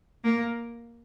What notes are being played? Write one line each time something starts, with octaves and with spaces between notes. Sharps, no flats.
A#3